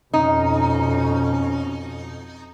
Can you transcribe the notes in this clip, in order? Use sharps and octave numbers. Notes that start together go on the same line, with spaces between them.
F2 B2 C#4 D#4